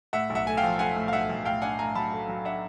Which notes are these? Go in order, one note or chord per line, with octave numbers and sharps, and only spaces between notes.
A2 E5 F#5
B1
E5 F#5
A3 G#5
F5 G5
F3
A3 F#5 G#5
A2
F5
B1 E5 F#5
B1
A2 F5 G5
D4 F#5 G#5
A2 G#5 A#5
F#3 A5 B5
A3
F#3
D4 E5 F#5